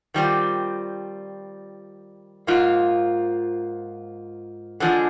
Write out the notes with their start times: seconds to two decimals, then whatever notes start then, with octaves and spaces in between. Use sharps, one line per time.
0.14 D#3 G3 C4 F4
2.47 G#2 F3 A#3 F4
4.80 D3 F3 G#3